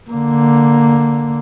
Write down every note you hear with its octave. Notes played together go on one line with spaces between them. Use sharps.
D3 A#3